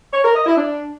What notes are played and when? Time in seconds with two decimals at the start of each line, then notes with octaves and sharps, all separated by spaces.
0.13 C#5
0.24 A#4
0.35 D#5
0.46 E4
0.57 D4